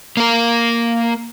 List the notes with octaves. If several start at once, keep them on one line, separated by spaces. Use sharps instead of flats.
A#3 A#4